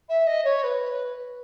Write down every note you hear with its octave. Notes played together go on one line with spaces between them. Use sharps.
E5
D#5
C#5
B4